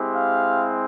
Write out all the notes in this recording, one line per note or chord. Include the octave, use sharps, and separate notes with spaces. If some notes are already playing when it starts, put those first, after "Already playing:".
Already playing: G#3 C4 E4 G4
F5